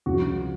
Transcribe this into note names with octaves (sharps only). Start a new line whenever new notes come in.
C#2 C#3 F3 F#4